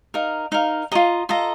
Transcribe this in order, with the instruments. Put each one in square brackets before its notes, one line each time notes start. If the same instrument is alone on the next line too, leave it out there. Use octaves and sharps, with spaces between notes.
[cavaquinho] D#4 A#4 F5
D#4 A#4 F5
F4 A4 D#5 A#5
F4 A4 D#5 A#5